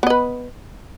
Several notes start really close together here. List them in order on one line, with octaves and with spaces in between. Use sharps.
B3 D#5 B4